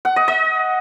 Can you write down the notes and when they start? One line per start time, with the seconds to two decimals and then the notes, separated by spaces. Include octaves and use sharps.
0.05 F#5
0.16 D#5
0.28 D#5